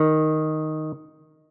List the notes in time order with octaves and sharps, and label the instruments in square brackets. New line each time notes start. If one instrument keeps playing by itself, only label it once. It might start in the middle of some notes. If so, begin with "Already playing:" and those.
Already playing: [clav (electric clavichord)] D#3